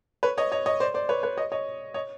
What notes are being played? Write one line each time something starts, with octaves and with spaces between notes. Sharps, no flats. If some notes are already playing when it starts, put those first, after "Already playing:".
B4 C#5
C#5 D#5
C#5 D#5
C#5 D#5
C5 D5
C5 D5
B4 C#5
B4 C#5
C#5 D#5
C#5 D#5
C#5 D#5